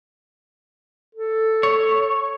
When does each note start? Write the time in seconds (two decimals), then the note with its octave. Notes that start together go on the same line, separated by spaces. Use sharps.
1.15 A4
1.63 C#5